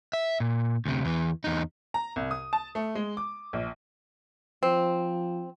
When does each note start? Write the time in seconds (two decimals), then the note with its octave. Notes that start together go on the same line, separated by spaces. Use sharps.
0.13 E5
0.40 A#2
0.86 D2 C3
1.05 E2 E3
1.44 E2 D#4
1.94 A#5
2.16 C2
2.31 D#6
2.53 A5
2.75 A3
2.95 G#3
3.17 D6
3.53 A#1
4.63 F3 C4